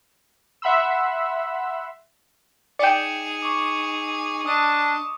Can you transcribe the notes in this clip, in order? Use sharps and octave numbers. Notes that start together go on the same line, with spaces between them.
E5 F#5 B5 C6 E6
D#4 G#4 D5 G5 C#7 E7
C#6 D6
D4 D#5 A5 D#6